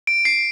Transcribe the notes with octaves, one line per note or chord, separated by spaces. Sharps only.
D7
C7